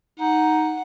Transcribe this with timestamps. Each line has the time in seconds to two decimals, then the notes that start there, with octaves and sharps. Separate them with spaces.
0.20 D#4 F#5